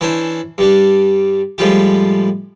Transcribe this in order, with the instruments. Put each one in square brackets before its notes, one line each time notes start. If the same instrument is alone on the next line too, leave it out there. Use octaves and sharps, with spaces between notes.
[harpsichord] E3 C#4 D4 E4 C5
G2 G3 D4
A2 F3 G3 G#3 F4 G4